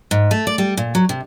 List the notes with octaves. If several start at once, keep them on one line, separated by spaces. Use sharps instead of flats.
G#2
A3
D5
G3
A#2
F#3
C3